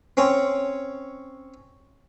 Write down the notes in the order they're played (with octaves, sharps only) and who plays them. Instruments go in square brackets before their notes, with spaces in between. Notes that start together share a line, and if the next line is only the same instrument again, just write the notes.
[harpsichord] C4 C#4 C#5